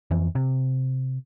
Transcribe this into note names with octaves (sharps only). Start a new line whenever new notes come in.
F2 E3
C3